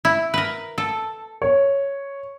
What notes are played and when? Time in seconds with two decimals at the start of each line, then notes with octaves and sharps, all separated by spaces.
0.05 E4
0.34 A#4 B4
0.78 A4
1.42 C#5